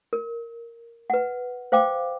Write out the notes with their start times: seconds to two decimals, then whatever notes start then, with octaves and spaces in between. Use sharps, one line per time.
0.13 A#4
1.10 B4 F#5
1.72 C5 F5 G5 D6